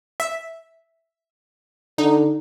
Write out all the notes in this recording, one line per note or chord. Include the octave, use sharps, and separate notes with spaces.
E5
D3 D#4